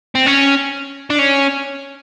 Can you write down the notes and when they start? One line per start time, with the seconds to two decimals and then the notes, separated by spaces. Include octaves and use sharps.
0.15 C4
0.26 C#4
1.10 D4
1.19 C#4